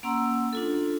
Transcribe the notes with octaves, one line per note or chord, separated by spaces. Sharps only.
A#3 C#4 F#5 A#5 C6 E6
D4 F4 A4